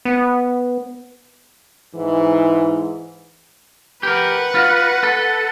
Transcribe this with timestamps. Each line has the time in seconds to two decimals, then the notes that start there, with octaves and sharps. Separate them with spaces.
0.05 B3
1.95 G#2 E3
4.03 G4 A#4 B4 F#5
4.55 F4 F#4
5.03 A4